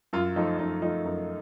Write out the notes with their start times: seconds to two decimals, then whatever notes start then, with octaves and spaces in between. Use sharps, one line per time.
0.13 F#2 F4
0.36 F3 A3 D#4
0.59 F#2 D#4
0.82 F3 A3 D#4
1.05 F#2